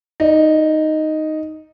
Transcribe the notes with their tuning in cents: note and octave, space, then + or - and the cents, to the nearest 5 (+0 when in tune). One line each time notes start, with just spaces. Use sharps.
D#4 +0 D5 +25